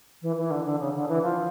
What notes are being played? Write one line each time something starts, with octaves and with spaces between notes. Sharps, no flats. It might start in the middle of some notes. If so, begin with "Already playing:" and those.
E3
E3
D3
D3
C#3
D3
E3
F3